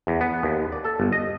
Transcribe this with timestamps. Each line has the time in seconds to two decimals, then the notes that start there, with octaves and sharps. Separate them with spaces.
0.07 E2
0.21 B3
0.43 D#2
0.72 D5
0.85 A4
1.00 G1
1.12 D#5